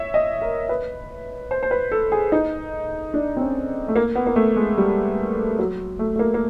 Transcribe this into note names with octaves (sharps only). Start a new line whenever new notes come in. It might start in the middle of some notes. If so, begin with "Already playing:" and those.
Already playing: C#5 E5
D#5
A#4
B4
C5
C5
B4
A4
G#4
D#4
D4
C4
C#4
A3
A#3
B3
A#3
A3
G#3
G3
F#3
A3
A3
A#3
A#3